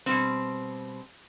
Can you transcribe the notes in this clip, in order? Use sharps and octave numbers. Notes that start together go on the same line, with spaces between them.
B2 G3 C4